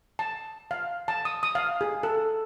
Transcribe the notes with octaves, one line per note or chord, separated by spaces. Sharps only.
A5
F5
A5
D#6
D#6
F5
G#4
A4